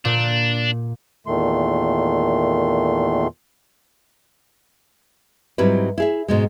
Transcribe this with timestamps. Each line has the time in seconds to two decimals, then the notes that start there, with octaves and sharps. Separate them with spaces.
0.05 A#2 D4
1.27 E2 A#2 D#3 A3 C6
5.58 G#2 F#3 G3 C4 E4 B4
5.98 E4 G#4 E5
6.28 G#2 B2 G#3